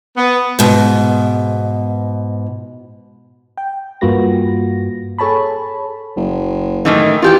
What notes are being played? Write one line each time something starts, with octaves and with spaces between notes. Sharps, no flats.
B3
G#2 B2
G5
G2 A#3 F4 F#4 B4 A#6
G#4 A4 C#5 A5 B5
F#1
A2 D#3 E3
E3 F4 G4 G5